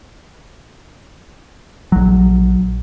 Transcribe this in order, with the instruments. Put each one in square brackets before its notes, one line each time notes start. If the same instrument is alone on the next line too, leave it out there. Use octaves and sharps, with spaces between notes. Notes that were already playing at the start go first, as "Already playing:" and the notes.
[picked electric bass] A#1 F#3